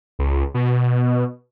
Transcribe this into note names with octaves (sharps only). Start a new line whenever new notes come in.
C#2
B2